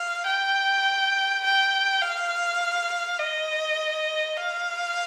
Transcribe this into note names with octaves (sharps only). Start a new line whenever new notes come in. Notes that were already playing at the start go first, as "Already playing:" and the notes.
Already playing: F5
G5
G5
F5
D#5
F5